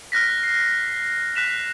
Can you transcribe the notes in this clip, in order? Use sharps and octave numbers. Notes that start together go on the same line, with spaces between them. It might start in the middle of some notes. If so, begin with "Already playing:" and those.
F6 F#6 A#6 B6
C7
F#6 B6 E7 F7